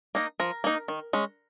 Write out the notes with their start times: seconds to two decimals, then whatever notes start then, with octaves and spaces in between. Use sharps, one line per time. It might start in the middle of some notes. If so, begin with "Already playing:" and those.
0.15 A#3 D#4
0.40 F3 A#4
0.64 A#3 D#4
0.88 D#3
1.13 G#3 C#4